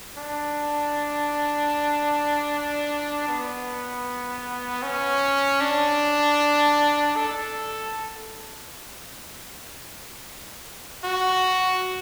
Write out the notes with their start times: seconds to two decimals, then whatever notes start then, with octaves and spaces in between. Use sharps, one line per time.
0.17 D4
3.28 B3
4.83 C#4
5.61 D4
7.16 A4
11.04 F#4